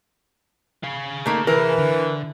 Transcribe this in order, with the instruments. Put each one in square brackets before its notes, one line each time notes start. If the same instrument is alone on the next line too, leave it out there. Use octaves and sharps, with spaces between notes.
[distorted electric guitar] G#4 F5
[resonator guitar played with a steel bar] A3 A#3 D#4
[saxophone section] E3 [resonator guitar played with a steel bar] A#4
[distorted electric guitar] D3